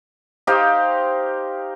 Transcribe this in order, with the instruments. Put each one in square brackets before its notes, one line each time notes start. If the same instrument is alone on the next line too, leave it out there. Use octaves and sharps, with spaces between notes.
[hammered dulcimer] D#4 G4 C5 F5